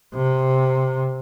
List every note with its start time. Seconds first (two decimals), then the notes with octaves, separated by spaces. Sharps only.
0.15 C3